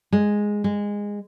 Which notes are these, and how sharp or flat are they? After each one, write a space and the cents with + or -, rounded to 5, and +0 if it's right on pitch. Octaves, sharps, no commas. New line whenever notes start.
G#3 -5
G#3 -15